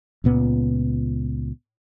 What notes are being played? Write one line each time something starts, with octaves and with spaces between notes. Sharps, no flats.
C#2 A#2 B3